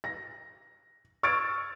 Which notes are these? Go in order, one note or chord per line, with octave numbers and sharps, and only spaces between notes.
A#6
C#6 E6 F6 G#6 A6 D7